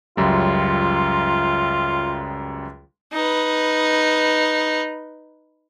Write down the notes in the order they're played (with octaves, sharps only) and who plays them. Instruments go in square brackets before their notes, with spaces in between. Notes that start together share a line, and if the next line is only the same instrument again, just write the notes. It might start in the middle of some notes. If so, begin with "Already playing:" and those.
[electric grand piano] C#2 F#2 G3 [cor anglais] F4
[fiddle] D#4 B4